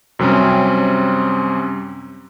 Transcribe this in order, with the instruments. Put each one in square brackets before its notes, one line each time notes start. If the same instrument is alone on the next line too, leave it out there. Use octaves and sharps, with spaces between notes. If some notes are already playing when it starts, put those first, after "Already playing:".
[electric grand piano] F#2 C3 G3 C4 C#4